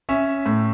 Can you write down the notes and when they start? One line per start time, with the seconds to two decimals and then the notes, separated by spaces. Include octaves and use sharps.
0.09 C#4 E5
0.46 A2